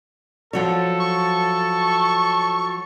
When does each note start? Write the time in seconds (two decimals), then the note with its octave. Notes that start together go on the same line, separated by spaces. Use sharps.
0.53 F3 F#3 A4 C#5
1.00 C#6